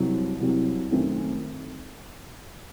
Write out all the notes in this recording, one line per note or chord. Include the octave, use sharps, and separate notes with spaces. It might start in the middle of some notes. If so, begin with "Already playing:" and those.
Already playing: C2 C3 F#3
C2 C3 F#3
F#2 D#3 A3 C4